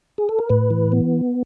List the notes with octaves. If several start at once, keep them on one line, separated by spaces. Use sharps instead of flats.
G#4
A4
A#4
A2 B4
E3
B3